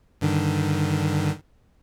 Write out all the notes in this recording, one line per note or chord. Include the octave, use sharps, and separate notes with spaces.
G2 D3 D#3